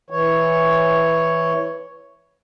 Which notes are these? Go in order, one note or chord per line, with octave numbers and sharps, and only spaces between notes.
E3 C#5